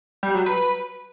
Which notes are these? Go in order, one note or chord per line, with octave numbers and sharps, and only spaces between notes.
G3
F#3
B4